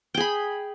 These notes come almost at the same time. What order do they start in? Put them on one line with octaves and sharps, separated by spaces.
G5 G#4 B5